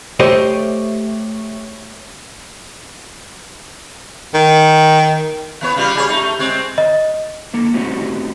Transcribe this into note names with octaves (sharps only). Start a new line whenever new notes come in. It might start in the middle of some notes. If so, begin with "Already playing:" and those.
A3 G4 C5 C#5 D#5 E5
D#3
E3 B3 C#5
C#3 G3 F4
G3 G#4 C#5
A3 D#4
A3
G#3 C4 C#5
D#5
D3 A#3 A4
A3 C4 C#4 D#4 F#4 G4